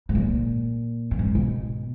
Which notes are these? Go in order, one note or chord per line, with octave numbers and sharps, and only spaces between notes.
G#2
A#2
F#2
G#2
B2